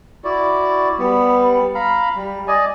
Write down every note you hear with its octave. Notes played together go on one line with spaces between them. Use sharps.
E4 F#4 D5
G3 B3
F5 A#5 B5
G3
D5 D#5 G#5